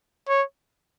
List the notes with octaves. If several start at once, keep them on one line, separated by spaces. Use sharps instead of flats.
C#5